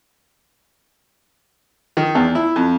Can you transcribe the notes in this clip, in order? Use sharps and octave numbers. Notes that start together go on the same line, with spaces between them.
D#3
E2
E4
F2